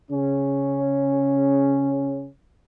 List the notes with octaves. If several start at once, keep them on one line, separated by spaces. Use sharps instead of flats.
C#3 C#4